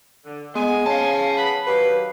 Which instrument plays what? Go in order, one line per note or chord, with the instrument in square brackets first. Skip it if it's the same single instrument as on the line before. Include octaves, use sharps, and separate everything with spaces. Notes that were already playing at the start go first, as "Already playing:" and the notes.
[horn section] D3
[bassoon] G#3 [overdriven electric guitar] B3 [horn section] G#5
[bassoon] C#3 [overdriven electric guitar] F5 A5
[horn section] B3 F#5 B5
[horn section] D#3 F#3 G4 [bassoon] B4